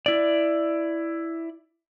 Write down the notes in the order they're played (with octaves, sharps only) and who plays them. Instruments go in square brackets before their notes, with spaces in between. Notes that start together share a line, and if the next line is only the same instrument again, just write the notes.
[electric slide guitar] E4 D5